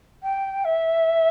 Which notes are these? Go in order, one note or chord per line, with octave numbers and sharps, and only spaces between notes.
G5
E5